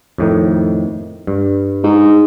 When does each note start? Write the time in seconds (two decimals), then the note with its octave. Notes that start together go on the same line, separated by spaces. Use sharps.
0.18 F2 A2 D#3
1.27 G2
1.83 G#2